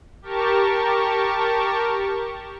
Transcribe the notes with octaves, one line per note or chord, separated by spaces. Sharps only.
G4 A#4 A5 C#6